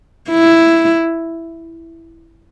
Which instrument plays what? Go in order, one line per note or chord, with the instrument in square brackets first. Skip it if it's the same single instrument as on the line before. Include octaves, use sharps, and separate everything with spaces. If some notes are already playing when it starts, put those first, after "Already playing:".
[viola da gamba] E4